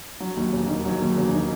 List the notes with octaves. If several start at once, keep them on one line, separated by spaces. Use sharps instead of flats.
F#3
D#2
E1
D#3
F#3
D#2
E1
D#3